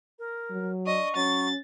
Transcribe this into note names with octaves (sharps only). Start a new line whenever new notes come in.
A#4
F#3
D4 D#5 C#6
F#3 C#4 A6